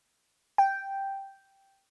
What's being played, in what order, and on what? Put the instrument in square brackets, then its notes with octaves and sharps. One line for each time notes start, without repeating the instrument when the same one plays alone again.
[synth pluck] G5